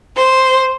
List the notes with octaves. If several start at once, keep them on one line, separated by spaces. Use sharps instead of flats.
C5